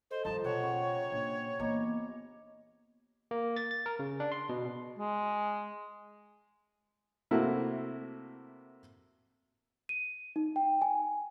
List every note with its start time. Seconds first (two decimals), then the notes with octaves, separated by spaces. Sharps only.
0.11 A4 C5 D#5
0.25 G2 D#3 F3 D#4 A5
0.44 B2 G4 C#5 F#5
0.63 C#3 C#6
1.12 A#2 D4
1.60 E3 A#3 B3 D#5 A#5 D6
3.31 A#3
3.56 A6
3.71 A6
3.86 A#4
3.99 C#3
4.20 D4
4.32 C6
4.49 B2
4.99 G#3
7.31 C3 A3 A#3 E4 F#4
9.89 D#7
10.36 D#4
10.56 G5
10.82 G#5